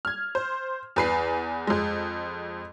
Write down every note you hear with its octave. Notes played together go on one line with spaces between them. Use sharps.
F6 G#6
C5
E2 B4 C7
F2 G#3